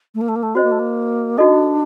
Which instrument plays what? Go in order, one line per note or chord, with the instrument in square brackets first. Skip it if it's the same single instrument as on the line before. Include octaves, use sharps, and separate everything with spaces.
[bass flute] A3
A#3
A3
A#3
A3
[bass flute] C4 [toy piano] F#4 C5 D#5
[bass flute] A#3
A3
A#3
[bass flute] D4 [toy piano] D#4 F#4 A4 D#5